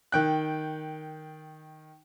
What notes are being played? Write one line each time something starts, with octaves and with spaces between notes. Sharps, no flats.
D#3 G5 F#6